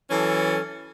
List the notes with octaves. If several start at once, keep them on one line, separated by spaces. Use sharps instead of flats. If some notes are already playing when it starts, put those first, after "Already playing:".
E3 F#3 C#4 A4